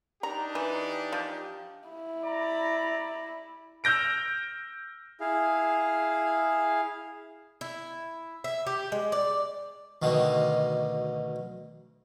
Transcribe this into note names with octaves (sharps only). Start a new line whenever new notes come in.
D4 D#4 G4 A#5
E3
F3
E4
D5 A#5 B5
E6 F6 G6 A#6 D7
E4 G#4 F5
E4
E5
G4
G#3
D5
D2 B2 D3 D#3